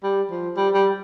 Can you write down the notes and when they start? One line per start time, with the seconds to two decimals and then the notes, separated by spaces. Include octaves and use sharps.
0.03 G3
0.31 F3
0.57 G3
0.74 G3